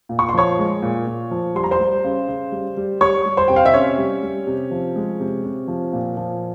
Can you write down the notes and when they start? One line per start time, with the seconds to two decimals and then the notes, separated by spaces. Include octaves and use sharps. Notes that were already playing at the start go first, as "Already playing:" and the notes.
0.09 A#2
0.19 C#6
0.29 C6
0.34 F3 C#5 C#6
0.58 G#3
0.82 A#2
1.07 A#2
1.31 F3
1.55 G3 C6
1.64 A#5
1.71 C5 C6
1.80 G3
2.04 C#3
2.28 C#3
2.52 G3
2.77 G3
3.01 G3 C#5 C#6
3.26 G3
3.37 C5 C6
3.48 C3 G5
3.56 F5
3.65 E5
3.74 C3 C#4 C#5
3.98 G3
4.23 G3
4.47 C3
4.71 F3
4.96 G#3
5.20 C3
5.44 C3
5.68 F3
5.93 A#2
6.17 F3